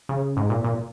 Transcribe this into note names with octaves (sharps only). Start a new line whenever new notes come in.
C#3
G#2
A#2
A#2